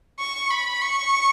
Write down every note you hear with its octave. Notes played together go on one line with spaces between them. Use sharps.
C#6
B5
C#6